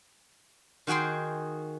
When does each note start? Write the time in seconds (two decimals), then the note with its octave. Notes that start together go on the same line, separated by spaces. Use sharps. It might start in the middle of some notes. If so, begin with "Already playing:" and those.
0.87 D#3 F#4 G#4 G5 C6